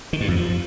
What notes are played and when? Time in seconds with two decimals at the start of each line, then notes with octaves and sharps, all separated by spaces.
0.13 D#3
0.21 G2
0.28 F2
0.36 F3